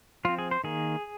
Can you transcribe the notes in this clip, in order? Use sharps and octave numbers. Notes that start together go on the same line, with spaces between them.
F3 C4 F4
G#4
C5
D#3 A#3 G#4